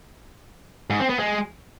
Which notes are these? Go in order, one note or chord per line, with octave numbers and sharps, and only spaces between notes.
G#2
C4
B3
G#3